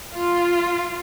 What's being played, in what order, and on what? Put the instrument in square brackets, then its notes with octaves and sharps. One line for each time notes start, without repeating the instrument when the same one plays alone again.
[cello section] F4